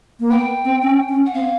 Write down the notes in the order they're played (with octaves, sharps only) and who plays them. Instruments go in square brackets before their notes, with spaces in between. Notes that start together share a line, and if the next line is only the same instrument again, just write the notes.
[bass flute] A#3
[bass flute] B3 [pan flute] G5
[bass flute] C4
C#4
C#4
[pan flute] F#5
[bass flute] C4 [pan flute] F5